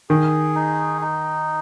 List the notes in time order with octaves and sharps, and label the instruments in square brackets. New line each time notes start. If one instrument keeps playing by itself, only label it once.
[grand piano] D#3 [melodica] G#4
[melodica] D#4
D#4